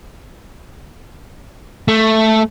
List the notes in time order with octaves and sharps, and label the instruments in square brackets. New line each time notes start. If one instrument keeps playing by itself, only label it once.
[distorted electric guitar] A3